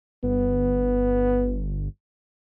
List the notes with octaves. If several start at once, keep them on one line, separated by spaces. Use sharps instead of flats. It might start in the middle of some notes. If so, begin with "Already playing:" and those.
G1 B3